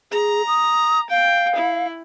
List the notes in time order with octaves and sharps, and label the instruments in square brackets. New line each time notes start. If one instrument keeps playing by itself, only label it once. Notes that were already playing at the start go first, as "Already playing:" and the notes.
[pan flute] G#4 [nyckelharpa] A#5
[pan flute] D#6
[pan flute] F5 [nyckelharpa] G5
[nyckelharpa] E4